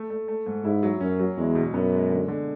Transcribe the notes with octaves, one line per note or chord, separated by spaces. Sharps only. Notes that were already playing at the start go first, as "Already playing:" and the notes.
Already playing: A3
A3
A3
G#2
G#2 E4
F#3
F#2 C#4
F#3
E2 G#3
B2
F#2 B3
G#3
D3
D3